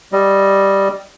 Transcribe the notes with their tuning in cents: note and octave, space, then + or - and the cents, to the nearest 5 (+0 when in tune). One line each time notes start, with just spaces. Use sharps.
G3 +0 D#5 +0